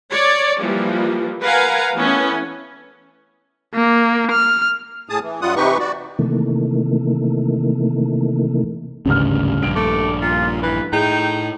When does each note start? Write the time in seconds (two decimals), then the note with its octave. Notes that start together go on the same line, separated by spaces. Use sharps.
0.11 C#5 D5
0.60 E3 F3 G3 A#3
1.43 A#4 B4 F5 F#5 G#5 A#5
1.96 E3 A3 B3 C#4
3.75 A#3
4.32 F6
5.09 A2 G#4 A5 D#6
5.23 E3
5.41 F#2 G3 F4 F#5 D#6
5.56 C3 E3 D#4 G4 B4 C#6
5.79 F#4 D5
6.19 C3 D#3 E3 A3 A#3
9.06 G#1 D2 G2 C#3 F6
9.63 A#1 G2 D7
9.76 A3 D6
10.22 A#2 F4
10.63 E3 B4
10.93 A2 D#4 G#4 G5